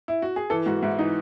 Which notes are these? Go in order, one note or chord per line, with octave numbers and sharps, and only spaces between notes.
E4
F#4
G#4
E3 A4
G#2 F#4
G#2 E4
E3 D#4